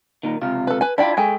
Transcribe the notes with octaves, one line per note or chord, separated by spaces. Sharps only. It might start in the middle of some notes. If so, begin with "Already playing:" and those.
A#2 D#3
C#2 C3 F4
A4 B4
B4 G#5
D4 E4 F4 D5 G5
G#3 G#4 A4 G5 G#5